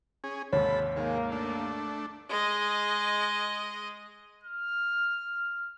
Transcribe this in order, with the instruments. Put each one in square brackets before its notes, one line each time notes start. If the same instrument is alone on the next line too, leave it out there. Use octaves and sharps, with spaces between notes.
[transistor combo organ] C#4 G#4
[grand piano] D#2 G#2 C3 [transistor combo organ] A4 B5 [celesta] C#5
[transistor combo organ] D#3 G#3 [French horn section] A#3
[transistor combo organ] A3 D4
[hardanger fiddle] G#3 D#5
[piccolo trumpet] F6